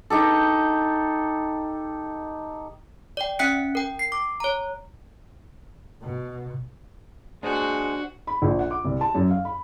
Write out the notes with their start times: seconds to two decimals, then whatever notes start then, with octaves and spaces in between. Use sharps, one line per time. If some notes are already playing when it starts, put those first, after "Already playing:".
0.10 D#4 G4 A4
3.17 D5 G5
3.39 C#4 E5 G5 F#6 B6 C#7
3.75 A#4 G5
3.99 C7
4.12 D6
4.40 C#5 A#5
6.02 B2
7.43 G#3 D4 F#4 C5
8.27 B5
8.42 A#1
8.59 F#5
8.71 D6
8.84 C2
9.01 A5
9.15 F#2
9.31 F5
9.45 B5